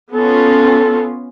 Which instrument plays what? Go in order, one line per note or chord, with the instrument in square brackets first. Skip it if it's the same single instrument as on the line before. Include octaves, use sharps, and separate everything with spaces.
[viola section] B3 C#4 F4 [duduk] A4